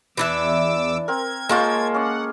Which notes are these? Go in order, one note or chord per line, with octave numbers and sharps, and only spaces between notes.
E2 E3 D4 E5 D6 E6
C4 A#4 G#6
G#3 A#3 F4 A4 C#5 G5
C#4 F#5 D6